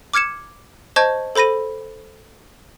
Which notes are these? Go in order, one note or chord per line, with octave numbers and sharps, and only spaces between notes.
D6 F6 G#6 C#7 E7
C5 D#5 A5 C#6 G6 G#6
A4 C5 B5 A#6 D#7